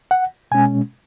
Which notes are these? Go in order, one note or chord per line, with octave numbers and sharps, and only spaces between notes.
F#5
B2 G#3 C#4 G#5